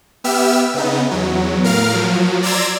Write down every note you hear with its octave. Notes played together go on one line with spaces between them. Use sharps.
B3 G4 E5 E6 F6
C#3 B3 D#4
E2 F#3
A2 A#4 F5 F6
F3 F#3
D5 A#5 C6 E6 G#6 A#6